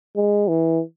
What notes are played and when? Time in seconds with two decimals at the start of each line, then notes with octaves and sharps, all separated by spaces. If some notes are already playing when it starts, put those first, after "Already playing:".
0.17 G#3
0.48 E3